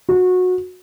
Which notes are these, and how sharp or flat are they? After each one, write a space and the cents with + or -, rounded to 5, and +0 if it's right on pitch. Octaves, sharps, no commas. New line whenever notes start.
F#4 -20